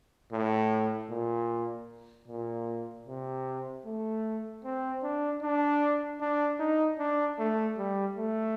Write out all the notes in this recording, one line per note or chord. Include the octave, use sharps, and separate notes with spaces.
A2
A#2
A#2
C3
A3
C4
D4
D4
D4
D#4
D4
A3
G3
A3